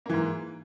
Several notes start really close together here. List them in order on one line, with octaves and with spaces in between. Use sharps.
A#3 E3 G#2